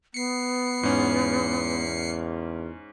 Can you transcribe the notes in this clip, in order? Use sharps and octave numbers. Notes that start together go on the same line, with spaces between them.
B3 C7 C#7
E2 G#2 C#4